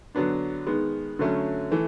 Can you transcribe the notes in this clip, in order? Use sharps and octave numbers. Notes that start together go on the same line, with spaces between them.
D3 F#3 B3 D4
D#3 G#3 B3
D3 F#3 A3 C#4
E3 A3